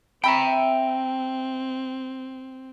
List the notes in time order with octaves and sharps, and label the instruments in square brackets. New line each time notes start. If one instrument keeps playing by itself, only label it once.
[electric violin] C4 [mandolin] E5 B5 [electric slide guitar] G5 A#5